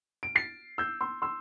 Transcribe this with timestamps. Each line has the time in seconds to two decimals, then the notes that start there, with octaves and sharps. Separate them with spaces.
0.23 D7
0.35 A6 C7
0.78 E6 G6
1.01 C6 E6
1.22 C6 E6